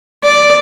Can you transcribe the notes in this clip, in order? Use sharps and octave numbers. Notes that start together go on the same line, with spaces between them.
D5